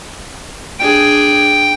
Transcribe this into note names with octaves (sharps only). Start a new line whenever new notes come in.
D4 G#4 G5